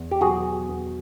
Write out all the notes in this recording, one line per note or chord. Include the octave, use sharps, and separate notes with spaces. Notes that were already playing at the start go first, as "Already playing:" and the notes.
Already playing: E2
G4
B2 F#3 F#4 G#4
E2